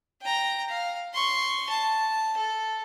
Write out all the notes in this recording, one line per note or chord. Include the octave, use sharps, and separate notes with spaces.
G5 A#5
F5
C6 C#6
A5
A4